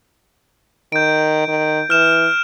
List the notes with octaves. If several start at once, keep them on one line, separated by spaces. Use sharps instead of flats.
D#3 G6 D7
D#3
E3 F6 E7